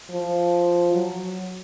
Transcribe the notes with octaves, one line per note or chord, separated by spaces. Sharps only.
F3
F#3